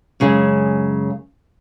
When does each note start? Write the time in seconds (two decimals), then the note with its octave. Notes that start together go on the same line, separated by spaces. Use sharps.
0.20 F#2 C#3 G#3 G#4